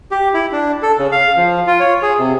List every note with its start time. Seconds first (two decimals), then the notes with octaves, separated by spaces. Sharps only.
0.11 G4
0.34 E4
0.52 D4
0.83 A4
0.98 C#3
1.12 F5
1.36 F3
1.67 F4
1.80 C#5
2.02 G#4
2.18 C3